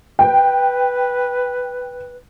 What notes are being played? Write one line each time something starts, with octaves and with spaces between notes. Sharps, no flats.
B4 G5